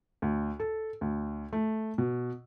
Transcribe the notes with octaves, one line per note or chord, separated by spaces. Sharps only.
D2
A4
D2
A3
B2